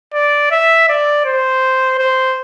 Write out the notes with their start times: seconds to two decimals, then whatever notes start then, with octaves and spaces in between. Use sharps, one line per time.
0.14 D5
0.51 E5
0.89 D5
1.25 C5
1.98 C5